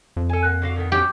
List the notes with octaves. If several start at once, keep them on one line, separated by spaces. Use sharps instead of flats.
F2
A4 G#5
A#3 F#5
D3 F#4 F5
A2 D#3 B3
F#3 C#4 G4